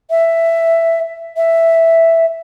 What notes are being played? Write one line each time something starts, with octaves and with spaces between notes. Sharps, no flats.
E5
E5